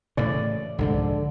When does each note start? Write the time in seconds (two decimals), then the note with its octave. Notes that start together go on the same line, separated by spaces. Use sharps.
0.17 A2 C#3 E3 D5
0.78 C2 G#2 D3 F3